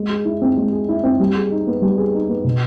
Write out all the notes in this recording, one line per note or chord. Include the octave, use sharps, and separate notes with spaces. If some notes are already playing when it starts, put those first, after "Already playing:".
Already playing: G#3
G#4
E4
C4
G#3
G#4
E4
C4
G3
G#4
D#4
B3
G3
G#4
D#4
B3
B2